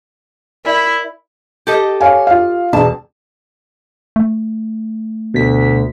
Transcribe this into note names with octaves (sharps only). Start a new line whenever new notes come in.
E4 A#4 D5 E5
G4 A4 D#5
C#5 F5 G#5
F4 F5
E1 A5
A3
D2 B2 B6